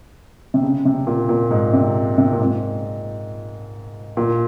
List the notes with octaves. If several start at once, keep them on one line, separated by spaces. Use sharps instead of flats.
C3
C#3
C3
A#2
A#2
G#2
C3
C3
A#2
G#2
A#2